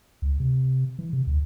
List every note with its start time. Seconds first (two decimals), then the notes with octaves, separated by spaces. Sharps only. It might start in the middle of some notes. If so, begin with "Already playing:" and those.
0.22 C#2
0.40 C3
0.99 E3
1.13 C3
1.27 D2